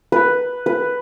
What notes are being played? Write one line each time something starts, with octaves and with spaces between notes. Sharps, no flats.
B4
B4